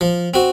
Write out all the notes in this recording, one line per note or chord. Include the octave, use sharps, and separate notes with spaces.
F3
C4 F#4